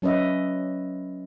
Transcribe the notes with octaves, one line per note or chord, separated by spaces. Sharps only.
F#3 C#4 B4 D#5 E5